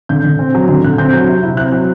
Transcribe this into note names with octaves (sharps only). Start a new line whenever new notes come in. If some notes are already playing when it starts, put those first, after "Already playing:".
D3 G6
D3
C4
F#3
D3
D3 F#6
C4 G6
F#3
C3
E4
C4 F#6
F#3